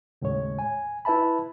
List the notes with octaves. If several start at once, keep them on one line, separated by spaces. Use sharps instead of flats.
D#2 A2 C#3 G#3 C#5
G#5
E4 B4 E5 A5 B5